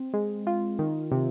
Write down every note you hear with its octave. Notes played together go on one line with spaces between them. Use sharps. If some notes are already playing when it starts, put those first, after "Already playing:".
Already playing: C4
G#3
F4
D#3
C3